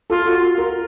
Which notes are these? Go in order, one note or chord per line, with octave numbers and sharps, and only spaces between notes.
F4 A4
F#4
A#4